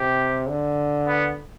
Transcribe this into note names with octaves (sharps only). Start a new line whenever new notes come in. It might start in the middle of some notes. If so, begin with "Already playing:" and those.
Already playing: C3 G4
D3
B3